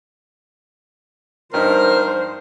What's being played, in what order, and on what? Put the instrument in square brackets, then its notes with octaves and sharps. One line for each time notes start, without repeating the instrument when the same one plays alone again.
[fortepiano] G2 D#4 [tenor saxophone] A#4 [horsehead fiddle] C5